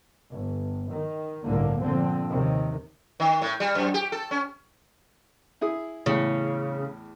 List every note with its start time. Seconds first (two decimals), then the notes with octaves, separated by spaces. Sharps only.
0.31 G1
0.93 D#3
1.44 G1 C2 A2 D3 A#3
1.80 A#2 D3 F3 C4
2.30 D#2 C3 D#3
3.20 D#3
3.42 A2
3.60 G3
3.75 F#2
3.94 G4
4.12 A4
4.31 C#4
5.61 E4 G#4 D#6
6.06 E2 A2 C#3